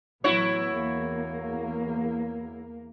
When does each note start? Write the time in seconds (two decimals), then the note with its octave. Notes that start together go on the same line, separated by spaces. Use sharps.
0.24 A1 F#3 B3 E4 F#4 C#5
0.70 E2 A#3